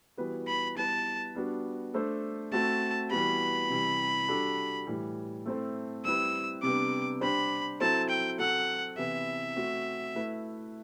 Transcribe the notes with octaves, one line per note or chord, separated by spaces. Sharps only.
E3 G3 B3 F#4 B4
B5
G3 B3 E4 B4 A5
G3 B3 D4 F#4
A3 D4 A4 C5
A3 C4 F#4 A4 A5
E3 G3 B3 F#4 B5
C3 E3 G3
G3 D4 F#4 A4
A2 E3 G3
A3 C4 E4 A4 C5
G3 C4 E4 B4 E6
C3 G3 B3 D4 D6
G3 D4 G4 C5 B5
F#3 C4 E4 A4 C5 A5
G5
F#3 C4 F#4 A4 F#5
C3 E3 B3 E4 E5
A3 C4 F#4
A3 E4 B4